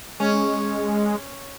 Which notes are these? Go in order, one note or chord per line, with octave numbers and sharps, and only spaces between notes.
G#3 C#4